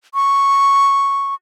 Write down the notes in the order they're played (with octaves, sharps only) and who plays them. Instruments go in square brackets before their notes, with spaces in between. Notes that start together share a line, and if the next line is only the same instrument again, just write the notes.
[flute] C#6